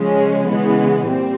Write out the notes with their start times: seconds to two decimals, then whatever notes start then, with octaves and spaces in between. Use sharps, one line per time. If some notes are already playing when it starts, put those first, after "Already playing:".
Already playing: C#3 F3 G#3 C#4
0.50 C#3 E3 G#3 B3
1.06 A#2 G3 C4